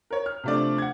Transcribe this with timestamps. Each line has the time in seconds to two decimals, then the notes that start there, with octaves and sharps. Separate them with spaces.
0.11 A#4 C#5
0.26 F6
0.44 C3 F3 A3 D4 D5
0.78 F#5 G#6